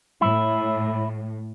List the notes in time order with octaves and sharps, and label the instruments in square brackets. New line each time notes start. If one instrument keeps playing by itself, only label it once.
[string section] A2 [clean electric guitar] E4